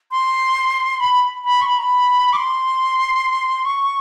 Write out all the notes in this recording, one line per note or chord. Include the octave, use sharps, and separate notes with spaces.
C6
B5
B5
C#6
B5
A#5
B5
D6
C6
C#6